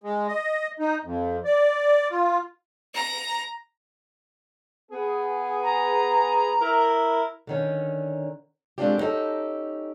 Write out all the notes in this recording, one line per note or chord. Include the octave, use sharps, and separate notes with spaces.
G#3
D#5
D#4
F2
D5
F4
A#5
B3 G#4
A#5
E4 A#4
D3 D#3 C#4
G#3 A3 C4 D4 F4 G4
B3 C#4 D#4 G4 A4